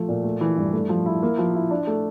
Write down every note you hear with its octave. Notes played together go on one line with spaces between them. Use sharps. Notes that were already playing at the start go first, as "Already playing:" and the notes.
Already playing: F3 A3
A#2
A3
E3
G2
A3
F3
E4
A#3
F3
E4
D4
A3